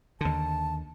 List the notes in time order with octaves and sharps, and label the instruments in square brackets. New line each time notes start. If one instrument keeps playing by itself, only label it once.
[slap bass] D#2 D3 [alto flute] A5